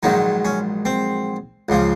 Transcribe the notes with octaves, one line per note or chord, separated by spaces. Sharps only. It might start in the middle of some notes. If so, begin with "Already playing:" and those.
A#1 G#2 D#3 F#3 D#4
C#4
C4
C#2 C#3 F3